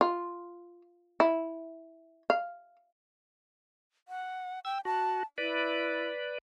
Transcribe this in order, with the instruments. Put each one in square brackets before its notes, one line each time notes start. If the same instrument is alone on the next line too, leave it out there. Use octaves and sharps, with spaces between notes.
[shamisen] F4
E4
F5
[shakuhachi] F#5
[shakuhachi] G5 [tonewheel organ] E6
[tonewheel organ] F#4 [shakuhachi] A5
[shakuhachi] E4 [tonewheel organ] B4 D5